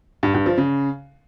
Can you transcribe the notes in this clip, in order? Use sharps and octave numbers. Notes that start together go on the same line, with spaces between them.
G2
G2
F3
C#3